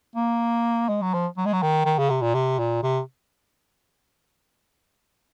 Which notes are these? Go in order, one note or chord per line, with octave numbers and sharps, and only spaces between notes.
A#3
G#3
F#3
F3
F#3
G#3
F#3
D#3
D#3
C#3
C3
A#2
C3
A#2
C3